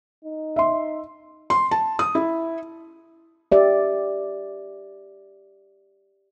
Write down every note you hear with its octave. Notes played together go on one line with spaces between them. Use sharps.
D#4
E5 C6
C6
A5
D#6
E4
G4 D5 E5